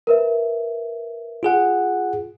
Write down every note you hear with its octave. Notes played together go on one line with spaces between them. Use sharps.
A#4 B4 E5
F4 G#4 F#5